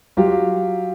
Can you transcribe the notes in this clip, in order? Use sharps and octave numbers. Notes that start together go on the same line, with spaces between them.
F#3 F4 G4